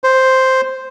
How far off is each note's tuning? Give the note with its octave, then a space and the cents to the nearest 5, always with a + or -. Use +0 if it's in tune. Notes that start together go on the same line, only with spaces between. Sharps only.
C5 +0